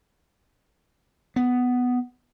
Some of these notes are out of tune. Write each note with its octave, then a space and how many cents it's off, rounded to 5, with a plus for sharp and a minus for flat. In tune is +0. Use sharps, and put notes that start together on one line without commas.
B3 +5